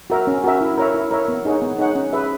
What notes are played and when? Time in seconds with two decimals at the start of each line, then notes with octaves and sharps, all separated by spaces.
0.10 F#4 A#4 E5
0.27 C#4
0.44 F#4 A#4 E5
0.61 E4
0.77 A#4 C#5 E5
0.94 E4
1.11 A#4 C#5 E5
1.28 B3
1.45 D#4 G#4 C#5 F#5
1.62 B3
1.78 D#4 G#4 C#5 F#5
1.95 C#4
2.13 G#4 B4 E5